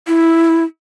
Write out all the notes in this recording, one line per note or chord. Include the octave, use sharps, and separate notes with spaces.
E4